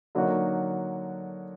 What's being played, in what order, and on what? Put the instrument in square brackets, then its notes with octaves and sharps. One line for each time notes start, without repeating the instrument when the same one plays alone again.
[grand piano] D3 F#3 A#3 D#4 F#4